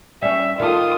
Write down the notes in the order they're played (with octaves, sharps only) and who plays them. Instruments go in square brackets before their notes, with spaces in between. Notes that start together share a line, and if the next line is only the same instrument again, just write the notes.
[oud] G3 C#4 [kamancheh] E5
[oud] D#3 A4 [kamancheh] F4 D#6